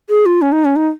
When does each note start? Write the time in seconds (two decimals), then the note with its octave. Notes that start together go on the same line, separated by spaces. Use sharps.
0.09 G#4
0.26 F4
0.42 C#4
0.52 D#4
0.65 C#4
0.76 D#4